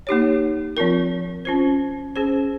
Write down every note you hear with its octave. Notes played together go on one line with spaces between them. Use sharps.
A#3 D#4 G4 C#5
F3 C4 F4 A#4
C#4 F4 C5
C#4 G#4 C5